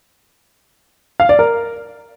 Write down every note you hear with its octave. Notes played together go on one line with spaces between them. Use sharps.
F5
D5
A#4